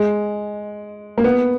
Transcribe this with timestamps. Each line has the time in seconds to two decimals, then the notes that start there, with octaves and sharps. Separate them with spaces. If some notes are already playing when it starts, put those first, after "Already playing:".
Already playing: G#3
1.18 A#3
1.24 B3